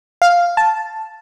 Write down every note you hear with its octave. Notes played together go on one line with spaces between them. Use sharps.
F5
A5